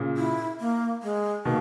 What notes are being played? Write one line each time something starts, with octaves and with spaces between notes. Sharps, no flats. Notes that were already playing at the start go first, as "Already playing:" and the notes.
Already playing: A#2 C#3
E4
A#3
G#3
B2 D#3 A#3